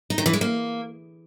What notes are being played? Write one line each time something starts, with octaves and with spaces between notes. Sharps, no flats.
D#4
D#3
E3
G#3
A#3